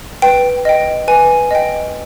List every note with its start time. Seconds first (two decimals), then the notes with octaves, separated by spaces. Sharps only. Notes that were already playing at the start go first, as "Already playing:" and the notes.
0.22 B4 G5
0.65 D#5 G5
1.08 B4 G#5
1.51 D#5 G5